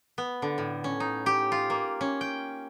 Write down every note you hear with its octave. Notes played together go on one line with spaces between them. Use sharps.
B3
D3
A2
C#4
D#4
G4
F4
A#3
C#4
G5